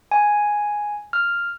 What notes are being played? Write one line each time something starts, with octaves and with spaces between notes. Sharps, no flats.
G#5
F6